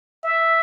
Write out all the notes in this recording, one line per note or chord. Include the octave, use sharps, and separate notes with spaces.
E5